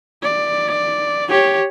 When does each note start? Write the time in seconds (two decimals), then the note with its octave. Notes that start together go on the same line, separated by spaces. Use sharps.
0.23 D5
1.29 G4 C#5